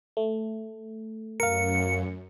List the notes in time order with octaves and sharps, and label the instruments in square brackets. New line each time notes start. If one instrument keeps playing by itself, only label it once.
[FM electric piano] A3
[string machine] F#2 [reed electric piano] A#4 F5 [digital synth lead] C#7